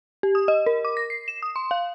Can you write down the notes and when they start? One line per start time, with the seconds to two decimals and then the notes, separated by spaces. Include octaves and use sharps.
0.23 G4
0.35 D#6
0.48 D#5
0.66 A#4
0.85 D6
0.97 A#6
1.10 C7
1.28 E7
1.43 D#6
1.56 C6
1.71 F5